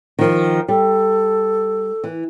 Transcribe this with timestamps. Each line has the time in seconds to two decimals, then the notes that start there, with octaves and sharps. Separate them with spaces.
0.19 D#3 F3
0.68 G3 A4
2.04 E3